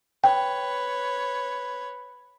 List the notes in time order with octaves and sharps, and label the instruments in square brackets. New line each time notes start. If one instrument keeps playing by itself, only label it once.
[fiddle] B4 C#5 [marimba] G5